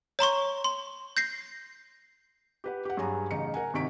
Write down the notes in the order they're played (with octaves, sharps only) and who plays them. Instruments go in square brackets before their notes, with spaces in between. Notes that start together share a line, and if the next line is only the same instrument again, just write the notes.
[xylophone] C#5 A#5 C6 C#6
C6
G6 A#6 C7
[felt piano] G4 B4 F#5
G4 F#5
G2 F#3 G#4 A#5
A1 C#3 D#4 C#7
A#4 F#5 G#5
G#1 C3 D#3 C#6 B6 D7